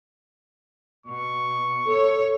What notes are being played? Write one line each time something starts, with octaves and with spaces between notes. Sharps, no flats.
B2 C#6
A4 C#5